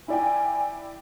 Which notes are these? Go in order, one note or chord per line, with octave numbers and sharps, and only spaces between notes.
E4 D5 G5 G#5